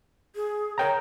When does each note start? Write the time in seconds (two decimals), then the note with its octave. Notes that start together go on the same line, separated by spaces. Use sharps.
0.35 G#4
0.78 A#4 C#5 G5 A#5